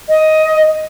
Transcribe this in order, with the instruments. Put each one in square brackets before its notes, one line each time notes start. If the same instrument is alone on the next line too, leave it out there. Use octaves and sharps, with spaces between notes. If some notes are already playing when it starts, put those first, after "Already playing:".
[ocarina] D#5